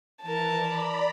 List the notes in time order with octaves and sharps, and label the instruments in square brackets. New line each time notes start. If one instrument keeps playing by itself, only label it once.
[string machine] E3 [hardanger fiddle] A#4 A5
[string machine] D5 A#5 B5